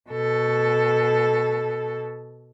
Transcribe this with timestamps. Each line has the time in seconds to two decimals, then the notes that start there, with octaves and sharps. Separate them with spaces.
0.10 B2 A4